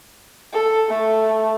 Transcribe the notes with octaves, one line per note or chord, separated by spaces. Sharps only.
A4
A3